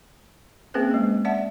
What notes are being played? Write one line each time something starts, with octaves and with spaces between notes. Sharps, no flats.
A#3 C4 C#4 G#4 B4 C5
G#3 A#3
D5 E5 F#5 A5